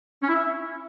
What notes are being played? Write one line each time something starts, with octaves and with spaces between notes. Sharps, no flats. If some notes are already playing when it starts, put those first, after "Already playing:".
C#4
E4
E5